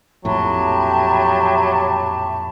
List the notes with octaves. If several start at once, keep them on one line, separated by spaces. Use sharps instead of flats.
A#1 F2 A2 F#3 G4 E5 A5 B5